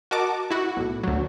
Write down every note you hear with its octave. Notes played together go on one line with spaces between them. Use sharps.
F#4 A#4 D#5 A5 D6
E4 F#4
B1 A2
D2 F#3